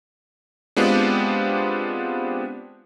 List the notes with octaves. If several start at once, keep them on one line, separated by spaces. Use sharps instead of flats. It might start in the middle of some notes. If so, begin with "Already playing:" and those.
G#3 B3 C4 D4 F4 G4